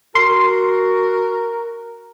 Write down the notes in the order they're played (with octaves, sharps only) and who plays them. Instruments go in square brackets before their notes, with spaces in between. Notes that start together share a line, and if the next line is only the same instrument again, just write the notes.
[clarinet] F#4 [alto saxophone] A#4 [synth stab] C6